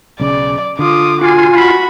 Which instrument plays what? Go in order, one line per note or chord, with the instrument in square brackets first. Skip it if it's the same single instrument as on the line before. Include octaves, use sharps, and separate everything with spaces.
[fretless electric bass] B1 C#3 [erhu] D5
[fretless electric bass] D3 [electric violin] F4 D#6 [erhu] D6
[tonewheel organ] F4 [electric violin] F#4 G#5
[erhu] F#4 [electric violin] B5